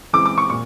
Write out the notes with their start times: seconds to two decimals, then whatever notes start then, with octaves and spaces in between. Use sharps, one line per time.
0.13 E3 G#3 C4 D6
0.26 D6
0.38 C#6
0.50 A#2 C#6